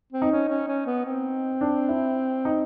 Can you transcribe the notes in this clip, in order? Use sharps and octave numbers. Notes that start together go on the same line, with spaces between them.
C4
D#4
C#4
C#4
C#4
B3
C4
D4
E4
D#4